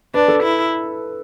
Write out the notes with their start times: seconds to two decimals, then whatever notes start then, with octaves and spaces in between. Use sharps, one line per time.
0.14 D4 B4
0.28 A4
0.43 E4